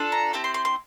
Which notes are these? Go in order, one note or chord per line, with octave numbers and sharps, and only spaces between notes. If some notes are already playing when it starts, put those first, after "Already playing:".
Already playing: D4 F4 A4
A#5
C4 E4 G4 A5
C6
C6
C6